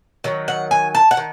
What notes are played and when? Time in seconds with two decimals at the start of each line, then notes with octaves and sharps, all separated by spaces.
0.24 D#3 F#3
0.48 F#5
0.71 G#5
0.95 A5
1.11 F#5
1.17 D#3